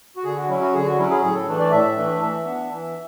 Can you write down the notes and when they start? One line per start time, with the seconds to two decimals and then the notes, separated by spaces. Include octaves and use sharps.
0.16 F#4
0.24 D3 G#4
0.37 F#4
0.49 F#3 C#4 E4
0.61 F#4
0.74 D3 G#4
0.85 F#4
0.98 F#3 C#4 E4
1.10 G#4
1.22 A2 G#4
1.35 A4
1.47 E3 A3 D4
1.59 D5
1.71 A2 E5
1.96 E3 A3 D4
2.20 E3
2.45 B3 D4
2.69 E3